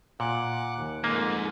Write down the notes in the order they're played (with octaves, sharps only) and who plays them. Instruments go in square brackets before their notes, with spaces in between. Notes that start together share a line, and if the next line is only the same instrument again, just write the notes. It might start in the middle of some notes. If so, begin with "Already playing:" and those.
[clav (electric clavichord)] A#2 [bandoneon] F#5 D6 F#6
[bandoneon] D#2
[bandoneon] F2 [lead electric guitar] G#2 [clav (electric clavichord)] A#3